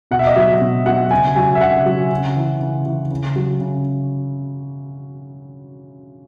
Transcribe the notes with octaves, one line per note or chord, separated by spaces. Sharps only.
B2 F#5
E5
D#5
F#3 E5
B2
F#3 F#5
C#3 G#5
F#3 G#5
E5
C#3 F#5
F#3
C#3
E3
C#3
E3
C#3
F#3
C#3